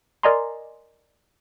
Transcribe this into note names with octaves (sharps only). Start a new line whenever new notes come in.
A#4 D5 D#5 G#5 A#5 C6